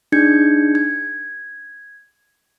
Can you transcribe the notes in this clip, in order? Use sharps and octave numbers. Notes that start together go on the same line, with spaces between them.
D4 D#4 G#4 G6 G#6 C#7
G#6